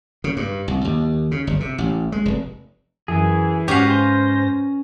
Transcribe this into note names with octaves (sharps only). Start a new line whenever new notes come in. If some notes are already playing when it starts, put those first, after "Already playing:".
C#3
G2
C2
D#2
C#3
G1
C3
A1
G#3
F1
F#2 E3 G#4
G#2 C#4 F#4 G4 B4 F5 A#6
C5